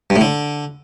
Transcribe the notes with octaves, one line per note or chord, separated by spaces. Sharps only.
G2
A2
D3